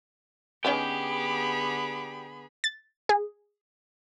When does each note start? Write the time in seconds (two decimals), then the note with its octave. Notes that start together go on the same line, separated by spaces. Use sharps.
0.65 D3 B3 C#4 D#4 G4 G#4 B4 B5
2.64 A6
3.09 G#4